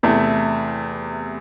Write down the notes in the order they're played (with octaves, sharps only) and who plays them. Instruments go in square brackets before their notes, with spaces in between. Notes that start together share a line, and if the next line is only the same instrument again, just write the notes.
[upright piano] E2 C3 A3 E4